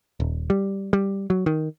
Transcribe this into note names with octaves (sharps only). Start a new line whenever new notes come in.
D#1
G3
G3
F#3
D#3